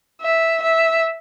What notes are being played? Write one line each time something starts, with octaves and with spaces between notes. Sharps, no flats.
E5
E5